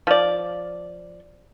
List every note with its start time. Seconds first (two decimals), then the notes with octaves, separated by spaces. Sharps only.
0.07 F3 D5